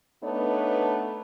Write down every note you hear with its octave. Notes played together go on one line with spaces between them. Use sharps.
A3 B3 D4 D#4 B4 C#5